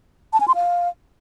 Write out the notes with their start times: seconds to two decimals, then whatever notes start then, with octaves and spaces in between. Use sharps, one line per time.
0.33 A5
0.40 G#5
0.48 C6
0.55 F5